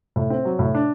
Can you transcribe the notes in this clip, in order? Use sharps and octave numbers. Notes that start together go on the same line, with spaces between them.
A2
C4
F#3
A2
D4